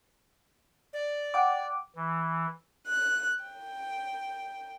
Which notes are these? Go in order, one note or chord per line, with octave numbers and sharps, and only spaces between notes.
D5
F#5 G5 D6
E3
F#6
G5